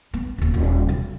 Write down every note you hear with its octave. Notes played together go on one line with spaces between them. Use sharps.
B3
D#1 D#2
D#1 A#1
B1